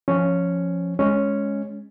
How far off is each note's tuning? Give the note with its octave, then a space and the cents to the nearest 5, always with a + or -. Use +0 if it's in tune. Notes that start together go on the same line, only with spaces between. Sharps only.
F3 +0 C#4 +0
G#3 +0 C#4 +0